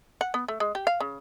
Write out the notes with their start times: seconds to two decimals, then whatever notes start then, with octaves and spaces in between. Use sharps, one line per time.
0.21 F#5
0.34 B3
0.48 A3
0.60 G#3
0.75 G4
0.87 F5
1.00 C#3